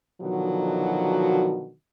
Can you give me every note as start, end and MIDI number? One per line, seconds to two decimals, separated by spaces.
0.21 1.71 47
0.21 1.71 50
0.21 1.71 51
0.21 1.71 53
0.21 1.71 54
0.21 1.71 66